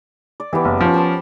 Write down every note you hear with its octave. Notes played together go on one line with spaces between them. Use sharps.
D5
E3 B3 G4
F#1
F3 C#4
C5 A5 C6